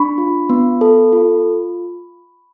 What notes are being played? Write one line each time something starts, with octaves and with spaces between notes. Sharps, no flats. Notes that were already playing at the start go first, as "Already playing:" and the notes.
Already playing: D4 B5 C#6
F4
B3
A4
F4